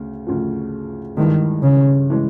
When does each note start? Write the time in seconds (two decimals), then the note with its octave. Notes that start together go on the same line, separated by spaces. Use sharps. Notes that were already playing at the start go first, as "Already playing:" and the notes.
Already playing: D2 C#3
0.27 D2 C#3 F3
1.17 G2 D#3 E3 G#3
1.63 C#3
2.10 E3 G#3